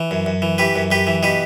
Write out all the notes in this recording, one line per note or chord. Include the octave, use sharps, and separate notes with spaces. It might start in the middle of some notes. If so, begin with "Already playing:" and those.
Already playing: E3
F#2
F#2
E3
E3 G4 B4
F#2
F#2 G4 B4
E3
B2 G4 B4